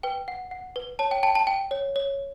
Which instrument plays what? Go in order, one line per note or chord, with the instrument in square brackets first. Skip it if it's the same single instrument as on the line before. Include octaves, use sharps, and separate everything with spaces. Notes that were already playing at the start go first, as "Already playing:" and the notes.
[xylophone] B4 G5
F#5
F#5
B4
C#5 A5
G5
G5 A5
A5
G5
C#5
C#5